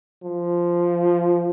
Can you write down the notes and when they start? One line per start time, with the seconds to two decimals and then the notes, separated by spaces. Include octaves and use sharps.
0.23 F3